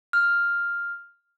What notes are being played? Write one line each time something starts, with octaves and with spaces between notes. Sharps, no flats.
F6